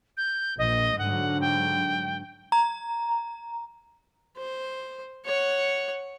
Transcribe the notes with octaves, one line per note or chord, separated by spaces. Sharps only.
G6
A#1 D#5
G#2 D3 F#3 F#5
G5
A#5
C5
C#5 F#5